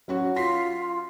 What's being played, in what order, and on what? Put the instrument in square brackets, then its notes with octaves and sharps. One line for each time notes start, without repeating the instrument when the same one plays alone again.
[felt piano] F#3 C#4 F#4
[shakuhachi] F4 [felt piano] C6 B6 C7